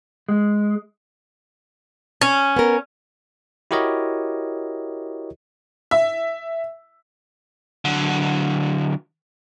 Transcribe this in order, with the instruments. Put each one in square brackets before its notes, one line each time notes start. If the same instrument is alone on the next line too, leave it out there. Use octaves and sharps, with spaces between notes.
[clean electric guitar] G#3
[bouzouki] C#4
[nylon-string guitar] B3 A#4
[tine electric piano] E4 F#4 G4 A#4 C#5 D#5
[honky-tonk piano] E5
[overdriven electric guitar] D3 F#3